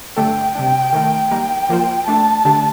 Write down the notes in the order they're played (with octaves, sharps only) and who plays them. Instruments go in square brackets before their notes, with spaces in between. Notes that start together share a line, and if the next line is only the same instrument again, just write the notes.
[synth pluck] G2 D3 A3 D4 A4 [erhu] G5
[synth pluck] C3 G3 D4 [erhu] G5
[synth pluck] D#3 A3 D#4 A#4
[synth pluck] G3 A#3 D#4 A#4 [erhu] G5
[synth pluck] F3 A#3 F4 C5
[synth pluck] A3 D4 A4 [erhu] A5
[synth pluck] D3 A3 D4 G4